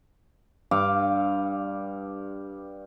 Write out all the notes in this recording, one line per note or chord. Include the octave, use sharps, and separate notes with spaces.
G2 F5 D6